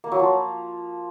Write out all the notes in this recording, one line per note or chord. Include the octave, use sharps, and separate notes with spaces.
A#3
F#3
F3